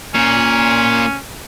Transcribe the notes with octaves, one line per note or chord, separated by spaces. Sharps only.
A#2 C#4